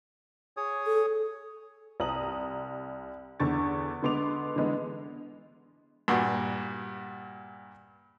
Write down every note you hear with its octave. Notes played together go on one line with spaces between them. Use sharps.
G#4 C#5 D#6
A4
C2 A#5 D#6 F#7
E2 D3 C#6 A6
D3 G#3 B3 C6 D6 F7
D3 E3 G#3 B3
G2 A#2 F#4